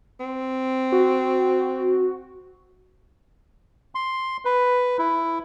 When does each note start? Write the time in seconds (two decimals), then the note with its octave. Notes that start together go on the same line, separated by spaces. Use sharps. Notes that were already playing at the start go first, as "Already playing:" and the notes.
0.20 C4
0.92 F#4
3.95 C6
4.45 B4
4.99 E4